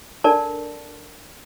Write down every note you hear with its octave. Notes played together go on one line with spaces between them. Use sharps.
D4 A4 A#4 D5 A5